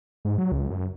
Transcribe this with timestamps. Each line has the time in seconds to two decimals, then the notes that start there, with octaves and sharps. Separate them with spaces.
0.25 G#2
0.38 F#3
0.52 C#2
0.70 F#2